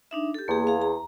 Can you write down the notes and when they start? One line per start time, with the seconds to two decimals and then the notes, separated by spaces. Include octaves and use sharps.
0.11 D4 D#4 E5
0.34 G4 A4
0.48 E2 A#3 G#4
0.67 G#4 F5
0.82 A#5